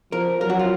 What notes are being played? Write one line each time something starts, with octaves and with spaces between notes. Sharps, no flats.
F3 A#4
F#3 A#4
F#4
F4